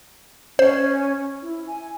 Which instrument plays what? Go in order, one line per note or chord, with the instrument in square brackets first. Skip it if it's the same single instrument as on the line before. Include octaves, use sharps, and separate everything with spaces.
[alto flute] C#4 [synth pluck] C5
[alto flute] E4
G#5